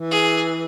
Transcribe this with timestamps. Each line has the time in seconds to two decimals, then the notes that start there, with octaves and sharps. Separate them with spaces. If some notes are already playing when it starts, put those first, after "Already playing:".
Already playing: E3
0.11 G#4